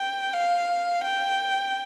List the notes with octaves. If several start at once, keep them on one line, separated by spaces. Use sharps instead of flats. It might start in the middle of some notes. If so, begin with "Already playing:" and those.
Already playing: G5
F5
G5